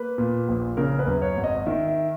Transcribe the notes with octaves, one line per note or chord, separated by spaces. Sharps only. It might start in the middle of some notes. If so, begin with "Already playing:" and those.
Already playing: A#3 B4
A#2
A#1
C#3 A#4
B4
F#2
C#5
G#1
D#5
D#3 E5
E5